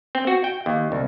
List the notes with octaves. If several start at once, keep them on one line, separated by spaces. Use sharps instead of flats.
C4
F#4
G5
D#2
C2